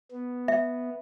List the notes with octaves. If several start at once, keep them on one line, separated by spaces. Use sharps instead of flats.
B3
E5